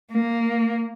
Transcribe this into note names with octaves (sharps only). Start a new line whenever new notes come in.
A#3